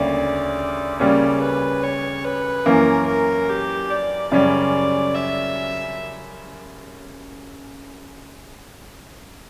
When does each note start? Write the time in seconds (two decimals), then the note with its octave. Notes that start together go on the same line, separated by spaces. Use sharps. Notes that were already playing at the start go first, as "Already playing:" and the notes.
Already playing: D2 C#3 G3 A#3 C#4 D5
1.00 C#3 G3 A#3 C#4 D5
1.41 B4
1.83 C#5
2.24 B4
2.65 F#2 E3 A#3 C#4 A#4
3.07 A#4
3.49 G4
3.90 D5
4.32 F#2 C#3 G3 C#4 D5
5.15 E5